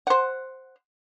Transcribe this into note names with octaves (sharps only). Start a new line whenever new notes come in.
C5 F#5